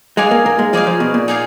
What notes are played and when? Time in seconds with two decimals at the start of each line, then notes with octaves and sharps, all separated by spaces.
0.17 G#3 D#4 G#4 D5 F5
0.31 A#3
0.46 A#3
0.59 G#3
0.73 F3 D#4 G#4 D5 F5
0.87 F3
1.00 B2
1.14 A#2
1.28 D#4 G#4 D5 F5